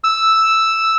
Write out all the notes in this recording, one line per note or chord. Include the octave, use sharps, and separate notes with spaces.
E6